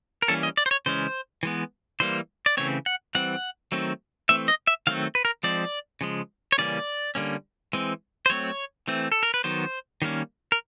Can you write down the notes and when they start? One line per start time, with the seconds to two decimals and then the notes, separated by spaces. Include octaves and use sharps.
0.22 A#4
0.28 E3 G3 A#3 C#4 A4
0.43 D#5
0.57 D5
0.66 C5
0.71 C#5
0.86 C#3 E3 G#3 C#4 C5
1.43 E3 G#3 B3
2.00 E3 G3 A#3 C5
2.46 D5
2.57 C#3 E3 A3 C4 C#5
2.86 F#5
3.15 E3 G3 C4 F#5
3.72 D#3 F#3 A3 C4
4.29 E3 A3 C4 E5
4.48 D#5
4.67 E5
4.87 D#3 F#3 A3 C4 F5
5.15 B4
5.25 A#4
5.43 F3 G#3 C4 D5
6.01 C#3 F3 G#3
6.52 C#5
6.58 C#3 E3 G3 A#3 C#4 D5
7.15 D3 G3 A#3 C#4
7.73 E3 G#3 C4
8.26 C5
8.30 F#3 A3 C4 C#5
8.88 E3 A3 C4
9.12 A4
9.23 A#4
9.34 B4
9.44 D#3 F#3 B3 C5
10.02 D#3 G3 A#3 C#4
10.52 A#4